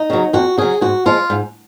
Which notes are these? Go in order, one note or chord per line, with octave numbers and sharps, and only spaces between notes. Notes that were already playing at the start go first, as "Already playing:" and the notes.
Already playing: D#4
C#3 F#3
F2 F#4
C#3 F#3 G#4
G#2 F#4
F3 G#3 F4
G#2